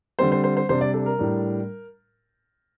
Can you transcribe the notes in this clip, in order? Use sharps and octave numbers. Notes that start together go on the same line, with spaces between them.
D3 G3 C4 C5
C5
C5
C5
C3 G3 D4 C5
D5
A4
A#4
A2 G3 D4